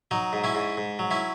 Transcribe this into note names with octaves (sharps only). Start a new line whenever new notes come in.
F#3 D#4
G#2
C#4 E4
G#2
G#2
F#3
C#4 E4